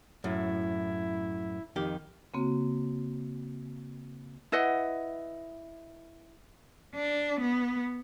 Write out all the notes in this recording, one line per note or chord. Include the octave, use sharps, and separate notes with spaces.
F#2 A2 E4
F2 D#3 G4
C#3 A#3 C4 F#4
E4 B4 D#5 F#5
D4
B3